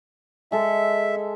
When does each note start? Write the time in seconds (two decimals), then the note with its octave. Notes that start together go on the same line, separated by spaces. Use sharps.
0.52 G#3 A4 E5